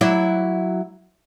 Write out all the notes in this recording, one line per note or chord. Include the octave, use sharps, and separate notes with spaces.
F#3 E4 D5